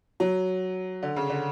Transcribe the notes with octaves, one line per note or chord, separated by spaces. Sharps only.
F#3
D3
C#3
D3